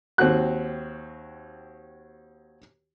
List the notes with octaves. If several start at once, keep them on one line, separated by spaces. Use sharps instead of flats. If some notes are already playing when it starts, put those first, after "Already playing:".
D#2 C4 F#4 F#6